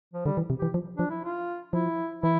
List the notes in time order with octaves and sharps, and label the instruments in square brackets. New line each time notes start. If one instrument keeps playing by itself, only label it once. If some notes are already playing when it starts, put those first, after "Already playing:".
[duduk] F3
[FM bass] D3 [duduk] G3
[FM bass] E3
C3
[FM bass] E3 [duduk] G4
[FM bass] F3
[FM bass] F3 [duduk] D4
[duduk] E4
F4
[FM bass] F3 [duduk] E4
[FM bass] E3 [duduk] E4